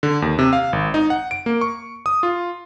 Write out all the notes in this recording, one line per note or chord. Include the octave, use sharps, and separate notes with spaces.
D3
D#2
C3
F5
G#1
D#4
F#5
D7
A#3
C#6
D#6
F4